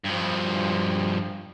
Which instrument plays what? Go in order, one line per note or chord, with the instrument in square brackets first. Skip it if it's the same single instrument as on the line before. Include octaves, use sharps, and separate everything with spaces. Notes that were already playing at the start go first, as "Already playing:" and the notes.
[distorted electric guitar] G2 F3